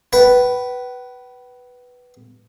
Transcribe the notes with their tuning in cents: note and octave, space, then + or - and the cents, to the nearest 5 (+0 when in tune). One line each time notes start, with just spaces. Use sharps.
B4 +0 G5 -45